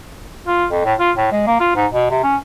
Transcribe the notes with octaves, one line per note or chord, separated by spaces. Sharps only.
F4
F2
A2
F4
A2
G#3
A#3
F4
G#2
B2
C3
C#4